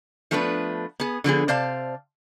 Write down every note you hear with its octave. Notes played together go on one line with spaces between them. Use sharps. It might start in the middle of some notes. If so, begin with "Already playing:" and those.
F3 A3 B3 D4 A#4 B4
B3 G#4
D3 F3 B3 G#4
C3 C5 D5 F5 A5